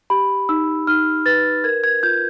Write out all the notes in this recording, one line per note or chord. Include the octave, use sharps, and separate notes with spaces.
G4 B5
D#4 E6
D#4 F6
B4 A6
A#4 G#6
G#6
F4 G6